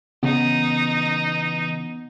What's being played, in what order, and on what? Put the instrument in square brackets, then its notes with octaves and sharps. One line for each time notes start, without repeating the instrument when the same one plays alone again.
[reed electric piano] C#3 [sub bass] E3 [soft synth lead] B3 [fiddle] D#4